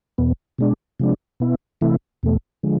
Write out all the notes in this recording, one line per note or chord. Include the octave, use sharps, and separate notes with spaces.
E2 B2 B3
B2 G#3 D4
C3 F3 G#3 D4
B2 B3 E4
C3 E3 A3 E4
E2 B2 A3
D3 F3 G#3